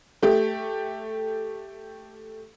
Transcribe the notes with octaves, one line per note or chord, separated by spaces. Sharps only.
A3 G4